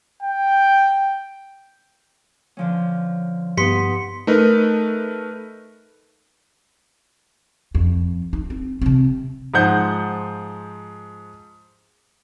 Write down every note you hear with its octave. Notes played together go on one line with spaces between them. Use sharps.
G5
D3 F3 C#4
G2 B3 D#4 B4 C6 B6 C#7
A3 D#4 A#4 B4
F2
D#4
C4
C3 C4
G#2 F3 C5 F#5 G6